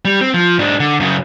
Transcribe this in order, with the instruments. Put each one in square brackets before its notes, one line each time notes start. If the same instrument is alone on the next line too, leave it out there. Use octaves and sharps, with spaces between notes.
[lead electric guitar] G3
C4
F3
G#2 D4
D3
F#2 C#3